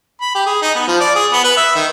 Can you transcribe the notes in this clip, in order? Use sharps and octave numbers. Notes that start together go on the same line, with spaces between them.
B5
G4
G#4
D#4
B3
F3
D5
G#4
B3
B4
E5
D#3